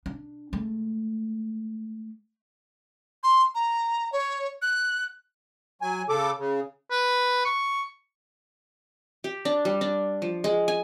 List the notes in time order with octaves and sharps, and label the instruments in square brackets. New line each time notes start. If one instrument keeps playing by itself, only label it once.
[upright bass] D4
G#3 A3
[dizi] C6
A#5
C#5
F#6
[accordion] F#3 G#5
C#3 A4 D6
C#3
[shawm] B4
C#6
[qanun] G4
D4
G3
D4
F3
G#3
G#5